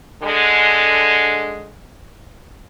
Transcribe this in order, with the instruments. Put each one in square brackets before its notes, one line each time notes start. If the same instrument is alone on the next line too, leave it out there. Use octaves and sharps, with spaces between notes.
[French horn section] D3 G#3